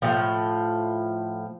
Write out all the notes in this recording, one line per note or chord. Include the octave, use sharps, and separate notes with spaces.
A2 C#3 F3